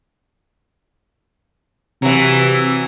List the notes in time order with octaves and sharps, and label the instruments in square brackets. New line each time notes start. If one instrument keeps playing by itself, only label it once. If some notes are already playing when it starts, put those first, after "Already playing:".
[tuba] C3 [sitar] E3 F#3